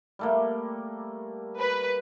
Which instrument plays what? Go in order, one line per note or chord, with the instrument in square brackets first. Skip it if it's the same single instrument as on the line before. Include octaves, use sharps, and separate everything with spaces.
[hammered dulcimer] G3 A3 A#3
[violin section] B4